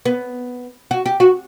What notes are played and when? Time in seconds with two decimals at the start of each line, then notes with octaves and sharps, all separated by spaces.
0.05 B3
0.91 F#4
1.06 G4
1.20 F#4